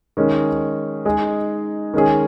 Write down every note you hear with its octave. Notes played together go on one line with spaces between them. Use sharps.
D#3 G#3 C#4
G#3 D#4 G#4
D#3 G#3 C#4 G#4